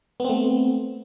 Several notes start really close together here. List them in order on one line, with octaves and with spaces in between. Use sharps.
B3 C4 A3